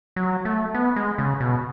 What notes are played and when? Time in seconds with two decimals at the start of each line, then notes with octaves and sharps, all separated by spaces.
0.16 F#3
0.45 A3
0.74 B3
0.96 G#3
1.18 C#3
1.40 B2